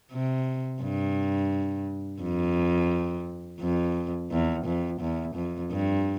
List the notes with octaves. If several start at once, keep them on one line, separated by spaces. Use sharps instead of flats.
C3
G2
F2
F2
E2
F2
E2
F2
G2